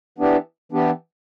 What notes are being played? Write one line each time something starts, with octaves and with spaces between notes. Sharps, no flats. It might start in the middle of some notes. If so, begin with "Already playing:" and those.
E3 B3 D4 G4
E3 B3 D4 G4